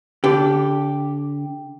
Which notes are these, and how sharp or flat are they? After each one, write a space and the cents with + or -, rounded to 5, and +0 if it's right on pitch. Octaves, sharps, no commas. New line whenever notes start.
D3 -30 G4 +0